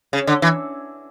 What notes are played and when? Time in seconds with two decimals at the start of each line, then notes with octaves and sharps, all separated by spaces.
0.13 C#3
0.27 D3
0.42 E3